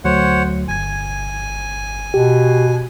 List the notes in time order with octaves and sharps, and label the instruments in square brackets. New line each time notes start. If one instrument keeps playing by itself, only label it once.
[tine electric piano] D2 F#3 A3 [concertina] C5 C#5 F#5
[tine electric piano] G1 G#6 [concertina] G#5
[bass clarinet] B2 [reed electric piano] G4